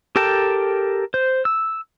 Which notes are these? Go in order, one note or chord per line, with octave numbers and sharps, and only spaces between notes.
G4 A4 A#4 G5 A5
C5
E6